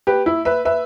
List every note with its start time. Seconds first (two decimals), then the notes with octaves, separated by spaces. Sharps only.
0.07 G4 B4
0.26 E4
0.45 B4 E5
0.65 B4 E5